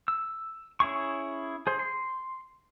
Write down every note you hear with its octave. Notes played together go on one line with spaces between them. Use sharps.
E6
C#4 E4 G#4 C#6
G#4 C5
C6